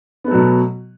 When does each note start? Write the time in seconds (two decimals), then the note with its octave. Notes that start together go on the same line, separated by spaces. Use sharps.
0.24 B3
0.28 A3
0.31 F#3
0.35 B2